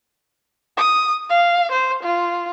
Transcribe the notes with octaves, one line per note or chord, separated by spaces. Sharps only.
D#6
F5
C5
F4